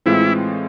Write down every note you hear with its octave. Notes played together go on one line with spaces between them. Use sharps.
A2 E3 G#3 C4 E4 F4